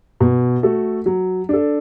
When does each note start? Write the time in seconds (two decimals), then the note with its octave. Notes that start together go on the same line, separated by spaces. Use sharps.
0.20 B2
0.63 A3 F#4 A4
1.06 F#3
1.49 D4 A4